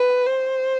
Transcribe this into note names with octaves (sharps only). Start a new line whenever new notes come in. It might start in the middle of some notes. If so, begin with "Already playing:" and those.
Already playing: B4
C5